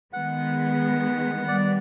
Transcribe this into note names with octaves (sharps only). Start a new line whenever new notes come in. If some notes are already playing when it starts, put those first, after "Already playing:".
D#3 G#3 B3 F#5
D#3 G3 B3 D5